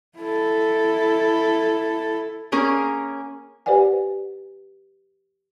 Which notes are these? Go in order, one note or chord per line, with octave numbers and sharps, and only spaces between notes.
E4 A4
A#3 C#4 G#4 A#4
G4 B4 C5 D5 F#5 G#5